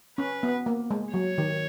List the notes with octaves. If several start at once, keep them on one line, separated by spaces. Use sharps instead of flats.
C#4 B4
B3
A#3
G#3
F#3 C#5
D#3